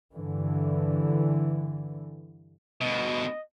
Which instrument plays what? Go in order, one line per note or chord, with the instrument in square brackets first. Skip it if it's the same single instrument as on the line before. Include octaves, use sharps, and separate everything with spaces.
[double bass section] G2 D3 E3
[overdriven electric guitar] D2 B2 [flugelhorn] D#5